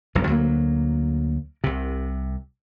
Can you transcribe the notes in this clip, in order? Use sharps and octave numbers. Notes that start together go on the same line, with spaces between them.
F1 B1 G2
D2 F#3 A#3
C2 C3